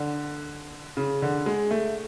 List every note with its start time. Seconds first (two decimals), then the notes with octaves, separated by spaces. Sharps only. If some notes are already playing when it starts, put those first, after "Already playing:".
Already playing: D3
0.97 C#3
1.22 D3
1.46 G#3
1.71 A3